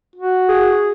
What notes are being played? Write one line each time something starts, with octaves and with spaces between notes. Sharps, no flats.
F#4
G#4